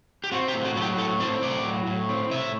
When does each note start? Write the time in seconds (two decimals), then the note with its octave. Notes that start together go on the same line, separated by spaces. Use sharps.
0.24 G4
0.32 C4 F#4
0.48 G4
0.54 A2
0.65 F#4
0.76 F#3 A4
0.81 G4
0.98 A2 A4
1.20 C4 A4
1.42 A2 D5
1.64 F#3
1.87 A2
2.09 C4
2.31 A2 E5